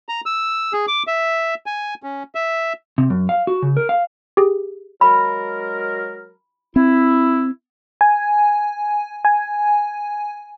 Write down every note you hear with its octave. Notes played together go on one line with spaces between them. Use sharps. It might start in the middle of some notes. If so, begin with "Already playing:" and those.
A#5
E6
G#4
D6
E5
G#5
C#4
E5
C3
F#2
F5
F#4
C#3
A#4
F5
G4 G#4
F#3 G#3 A#4 B5
C4 E4
G#5
G#5